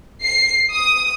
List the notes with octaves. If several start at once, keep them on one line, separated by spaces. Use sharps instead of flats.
C7
D#6